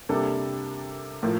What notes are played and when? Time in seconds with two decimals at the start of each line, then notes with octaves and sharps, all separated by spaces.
0.09 C3 G3 A#3 D4 A4
1.23 A2 F3 A#3